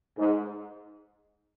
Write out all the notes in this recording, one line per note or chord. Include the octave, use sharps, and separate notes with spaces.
G#2